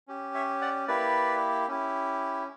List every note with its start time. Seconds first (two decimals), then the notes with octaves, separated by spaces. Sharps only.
0.08 C#4 G4
0.34 C#5 E5
0.61 D5 F#5
0.87 A#3 E4 G4 B4 D5
1.68 C#4 E4 G4